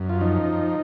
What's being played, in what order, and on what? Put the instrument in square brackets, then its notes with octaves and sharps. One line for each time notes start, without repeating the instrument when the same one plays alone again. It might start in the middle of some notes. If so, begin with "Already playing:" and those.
Already playing: [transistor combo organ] F#2
F4
F3 D#4